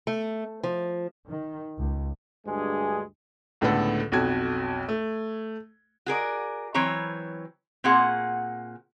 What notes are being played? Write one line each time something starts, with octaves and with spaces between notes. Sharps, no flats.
A3
F3
D#3
C#2
D2 G2 G#3 G#4
C#2 A2 D3 B3 A4 F#5
B1 F2 F#4 G#6
A3
F#4 G#4 A#4 D5
E3 F#3 C4 C#5 A#5
A#2 C4 F#4 G#4 F#5